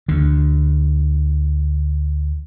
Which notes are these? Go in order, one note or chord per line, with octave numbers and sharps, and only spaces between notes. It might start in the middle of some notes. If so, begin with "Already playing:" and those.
D2 D3